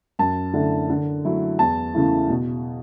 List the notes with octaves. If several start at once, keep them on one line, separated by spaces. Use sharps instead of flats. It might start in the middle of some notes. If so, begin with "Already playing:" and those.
F#2 A5
D3 A3 E4
D3
F#3 A3 E4
E2 A5
C#3 E3 A3 E4
B2